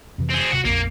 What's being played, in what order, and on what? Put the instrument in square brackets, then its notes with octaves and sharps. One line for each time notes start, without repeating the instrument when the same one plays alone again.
[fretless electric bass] F2 C3 E3
[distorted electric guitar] C4 G#4
[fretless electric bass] D1 C3 [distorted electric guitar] F#4
[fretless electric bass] A#1 F2 [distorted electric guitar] A#3